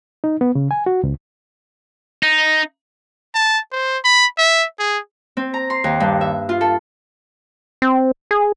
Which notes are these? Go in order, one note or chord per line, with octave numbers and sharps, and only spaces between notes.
D#4
B3
C#3
G#5
F#4
C#2
D#4
A5
C5
B5
E5
G#4
C4
A#5
C6
D#2
G2
E5
F4
A4
C4
G#4